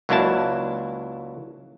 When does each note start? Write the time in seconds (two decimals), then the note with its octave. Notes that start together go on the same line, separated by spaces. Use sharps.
0.09 C#2 F#3 A#3 D4 E4 A5